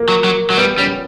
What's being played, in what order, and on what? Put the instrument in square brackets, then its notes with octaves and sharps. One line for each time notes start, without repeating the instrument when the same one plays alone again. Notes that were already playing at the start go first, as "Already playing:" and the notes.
Already playing: [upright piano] A#3
[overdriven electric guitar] F#3
F#3
F#3
[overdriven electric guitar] G3 [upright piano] B3
[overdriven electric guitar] G3 [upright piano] C#4